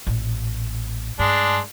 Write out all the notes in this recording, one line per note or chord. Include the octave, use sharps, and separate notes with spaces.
A1 A#2
G2 G#3 D4